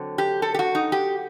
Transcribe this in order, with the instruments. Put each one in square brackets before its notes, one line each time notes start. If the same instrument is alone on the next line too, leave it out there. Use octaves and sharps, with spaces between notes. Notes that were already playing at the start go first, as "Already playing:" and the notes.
Already playing: [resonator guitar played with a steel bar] D3 F#3 C4
G4
A4
G4
F#4
D#4
G4